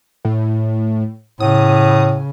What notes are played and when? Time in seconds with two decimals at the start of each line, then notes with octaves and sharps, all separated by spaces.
0.25 A2
1.40 A2 C#3 D#6